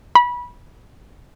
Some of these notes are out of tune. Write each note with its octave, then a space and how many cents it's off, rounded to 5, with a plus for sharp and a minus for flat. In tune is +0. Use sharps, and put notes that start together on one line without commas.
B5 -20